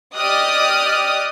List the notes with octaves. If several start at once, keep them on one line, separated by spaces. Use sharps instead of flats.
G4 D5 D#5 D#6 F6 F#6